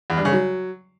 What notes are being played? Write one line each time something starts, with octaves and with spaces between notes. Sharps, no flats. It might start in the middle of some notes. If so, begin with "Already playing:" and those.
E2
G2
C#3
F#3